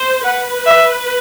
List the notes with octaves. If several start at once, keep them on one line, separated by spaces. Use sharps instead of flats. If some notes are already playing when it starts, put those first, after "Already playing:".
Already playing: C5
B4 F#5
E5